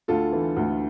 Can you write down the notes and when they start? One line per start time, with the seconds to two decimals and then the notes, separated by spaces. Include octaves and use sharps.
0.08 D2 F4 A4
0.32 E3
0.57 D2